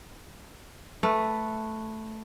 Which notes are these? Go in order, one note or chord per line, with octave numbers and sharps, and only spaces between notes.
A3 B4